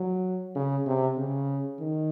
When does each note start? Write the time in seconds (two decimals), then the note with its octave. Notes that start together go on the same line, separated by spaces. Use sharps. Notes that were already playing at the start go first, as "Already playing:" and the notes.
Already playing: F#3
0.55 C#3
0.86 C3
1.18 C#3
1.80 D#3